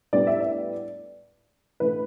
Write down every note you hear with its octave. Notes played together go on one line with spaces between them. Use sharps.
A2 G3 B3 D4 D5
E5
D5
A2 E3 A3 D4 B4